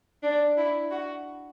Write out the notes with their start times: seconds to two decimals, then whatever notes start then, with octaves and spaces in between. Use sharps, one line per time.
0.23 D4
0.57 E4
0.91 F#4